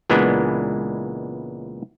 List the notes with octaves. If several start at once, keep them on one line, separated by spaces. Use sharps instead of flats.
C#2 A#2 E3 G#3 B3 D4